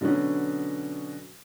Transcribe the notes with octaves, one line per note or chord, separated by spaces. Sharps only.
B2 D3 F#3 B3 C#4